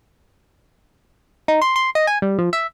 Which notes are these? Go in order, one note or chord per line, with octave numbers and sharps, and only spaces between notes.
D#4
C6
C6
D#5
G#5
G3
F3
E5